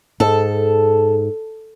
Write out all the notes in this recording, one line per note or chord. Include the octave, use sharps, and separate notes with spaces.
G#2 A4